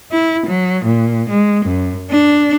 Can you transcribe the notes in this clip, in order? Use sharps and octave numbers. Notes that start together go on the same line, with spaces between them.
E4
F#3
A#2
G#3
F#2
D4